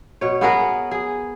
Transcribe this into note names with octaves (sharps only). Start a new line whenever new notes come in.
B2 C#5
B3 G#4 A#4 B4
G#4